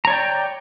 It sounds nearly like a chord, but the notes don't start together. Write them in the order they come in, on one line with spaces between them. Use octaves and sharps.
A#5 C#5 D5 G5